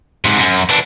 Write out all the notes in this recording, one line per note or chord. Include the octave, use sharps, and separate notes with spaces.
G#2 C3
F#2
E3 D4